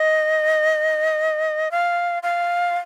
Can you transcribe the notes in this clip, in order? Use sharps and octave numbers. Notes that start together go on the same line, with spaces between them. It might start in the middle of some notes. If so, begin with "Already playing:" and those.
Already playing: D#5
F5
F5